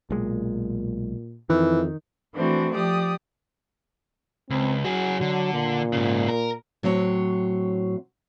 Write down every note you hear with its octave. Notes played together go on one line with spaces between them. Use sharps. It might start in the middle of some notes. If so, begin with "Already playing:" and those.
B1 A#2 G#3
F2 D#3 E3
E3 A3 C4 D4 F#4
F3 G4 D5 D#6
C#2 C4
F#3 F#4 G#4
D3
A#2
G#2 C#3
A#4
A2 F#3 C4 C#5